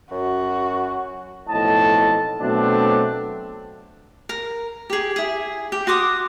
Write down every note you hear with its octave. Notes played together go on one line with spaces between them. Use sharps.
F#2 F#4
B1 F2 A2 D#5 A5
B2 F#3 A3 C4 D4
A#4
G4 G#4
E4 G#4
G4
F#4 C6 D6 D#6